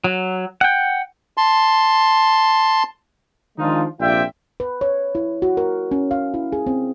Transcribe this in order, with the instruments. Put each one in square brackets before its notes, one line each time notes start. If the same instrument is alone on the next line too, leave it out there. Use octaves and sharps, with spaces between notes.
[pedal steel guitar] F#3
F#5 G5
[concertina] A5 C6
[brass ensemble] D#3 F3 G#3 D4 D#4 F4
A#1 C3 F4 D5 E5 G5
[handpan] B4
C#5
E4
F#4
A#4
C#4
F5
E4
G#4
C4